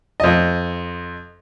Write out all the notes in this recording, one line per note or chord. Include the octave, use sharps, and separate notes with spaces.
F2 D#5